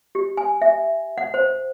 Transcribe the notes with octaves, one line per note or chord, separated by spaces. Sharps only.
G4
G#5
E5
F#5
C5